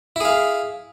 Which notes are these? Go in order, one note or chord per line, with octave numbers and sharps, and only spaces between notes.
E4 G#4 F5